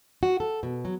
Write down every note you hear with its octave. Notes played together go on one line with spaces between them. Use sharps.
F#4
A4
B2
F#3